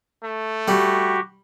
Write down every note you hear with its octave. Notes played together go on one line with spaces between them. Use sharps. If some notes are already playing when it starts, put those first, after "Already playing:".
A3
G3 F#4 G4